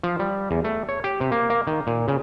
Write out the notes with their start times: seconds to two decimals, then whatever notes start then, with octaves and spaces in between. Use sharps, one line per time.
0.03 F3
0.19 G3
0.51 E2
0.64 A3
0.89 C#5
1.04 G4
1.21 C3
1.32 A#3
1.50 A#3
1.67 D#3
1.87 A#2
2.08 C#3